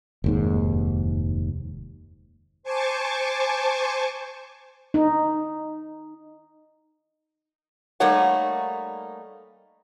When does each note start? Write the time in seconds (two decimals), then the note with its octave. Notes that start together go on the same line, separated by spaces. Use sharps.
0.24 F1 D#2 G#2
2.63 C5 G#5 A5 C#6 D6
4.94 D#4
8.00 G3 A3 A#3 D#4 C#5 F#5